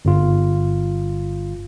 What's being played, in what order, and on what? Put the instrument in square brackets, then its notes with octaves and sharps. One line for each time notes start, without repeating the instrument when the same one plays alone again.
[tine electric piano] G1 F4